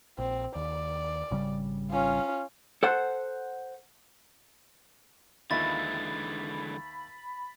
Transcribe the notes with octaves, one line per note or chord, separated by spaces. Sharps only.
A#1 C4
D#2 D5
G#1 C#3 G3
C#4 F4
A4 C5 F#5
D#2 D3 E3 G#3 F4 E5 B5 A6